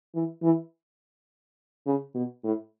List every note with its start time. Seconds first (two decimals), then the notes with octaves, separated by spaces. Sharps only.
0.15 E3
0.43 E3
1.86 C#3
2.15 B2
2.44 A2